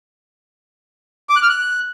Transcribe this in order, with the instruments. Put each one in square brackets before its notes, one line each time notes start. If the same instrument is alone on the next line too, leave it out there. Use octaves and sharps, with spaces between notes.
[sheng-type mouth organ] D6
F#6
F6
F#6